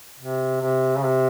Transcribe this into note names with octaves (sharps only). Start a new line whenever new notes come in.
C3
C3
C#3
C3